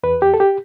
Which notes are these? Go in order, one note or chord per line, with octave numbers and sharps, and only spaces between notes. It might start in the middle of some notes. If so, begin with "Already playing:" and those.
E2 B4
G4
A4
G4